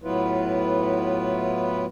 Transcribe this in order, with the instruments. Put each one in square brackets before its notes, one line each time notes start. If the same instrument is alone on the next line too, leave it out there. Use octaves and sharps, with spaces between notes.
[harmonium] A2 F#3 B3 E4 F4 B4